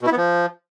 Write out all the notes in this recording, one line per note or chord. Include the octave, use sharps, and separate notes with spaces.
B2
E4
B3
F3